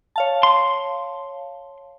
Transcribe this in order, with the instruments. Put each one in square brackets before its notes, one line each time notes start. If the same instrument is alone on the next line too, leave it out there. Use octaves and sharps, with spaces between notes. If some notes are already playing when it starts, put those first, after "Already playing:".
[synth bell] C#5 F5 A5
[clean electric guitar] C6